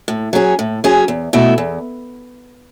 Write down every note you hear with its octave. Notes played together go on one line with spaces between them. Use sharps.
A2
F#3 C#4 G#4
A2
F#3 C#4 G#4
E2
B2 A3 E4
E2